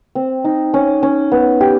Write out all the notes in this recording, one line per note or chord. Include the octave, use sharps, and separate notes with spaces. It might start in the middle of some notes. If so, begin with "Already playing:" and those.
C4
D#4
C#4
C#4
B3
G4